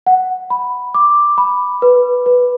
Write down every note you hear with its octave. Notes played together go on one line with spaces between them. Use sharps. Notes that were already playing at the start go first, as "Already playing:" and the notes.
F#5
B5
D6
B5
B4
B4